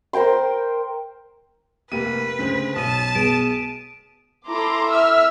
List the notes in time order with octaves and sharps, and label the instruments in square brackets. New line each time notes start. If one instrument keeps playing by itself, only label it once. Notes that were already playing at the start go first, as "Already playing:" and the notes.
[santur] A#4 C5 G5 C6
[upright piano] F1 A#3 D#7 [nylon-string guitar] G4 [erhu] B4
[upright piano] D2 C#3 C5 [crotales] B6
[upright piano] B1 [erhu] A5 [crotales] D#6 D#7
[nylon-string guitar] A3 B3 G#4 [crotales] D7 E7
[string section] E4 A4 A#5 C6 D6
E5 E6 F6